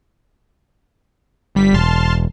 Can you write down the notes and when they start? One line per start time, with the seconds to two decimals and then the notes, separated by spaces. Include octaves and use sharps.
1.55 G1 G3 B6
1.74 E1 A5 C6 F6